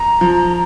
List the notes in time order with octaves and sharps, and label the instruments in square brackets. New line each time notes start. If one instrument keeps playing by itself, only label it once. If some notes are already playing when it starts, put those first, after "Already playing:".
Already playing: [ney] A#5
[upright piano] F3